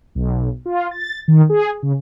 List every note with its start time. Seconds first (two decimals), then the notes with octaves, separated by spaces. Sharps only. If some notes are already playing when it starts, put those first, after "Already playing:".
0.15 B1
0.66 F4
0.91 A6
1.28 D#3
1.50 G#4
1.83 C#3